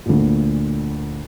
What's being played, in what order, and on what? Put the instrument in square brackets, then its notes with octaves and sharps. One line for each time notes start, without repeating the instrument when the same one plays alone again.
[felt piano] D2 A#2